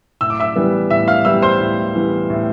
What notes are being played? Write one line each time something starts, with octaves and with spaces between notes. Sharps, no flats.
A2 E6
D6
E5 E6
E3 G3 B3
A2 E5 E6
F5 F6
E3 G3 B3 E5 E6
C5 C6
A2
E3 G3 B3
A2